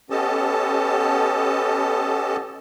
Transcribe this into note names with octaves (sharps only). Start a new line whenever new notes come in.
B3 C#4 G4 A4 D#5 A5